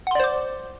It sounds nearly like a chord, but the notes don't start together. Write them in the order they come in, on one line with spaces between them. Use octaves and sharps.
F#5 C6 D5 C5 D6